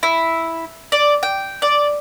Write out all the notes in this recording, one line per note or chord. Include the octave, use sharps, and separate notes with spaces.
E4
D5
G5
D5